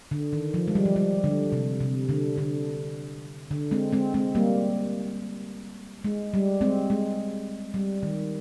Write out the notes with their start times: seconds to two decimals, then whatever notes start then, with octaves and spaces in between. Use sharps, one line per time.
0.11 D3
0.33 D#3
0.54 F3
0.68 G#3
0.75 G3
0.85 F3
0.96 G3
1.24 D3
1.52 C3
1.81 C3
2.09 D3
2.38 D3
3.51 D3
3.71 G#3 C4
3.93 G#3 C4
4.14 G#3 C4
4.35 G3 A#3
6.04 G#3
6.34 G3
6.61 G#3 C4
6.90 G#3
7.74 G3
8.03 D#3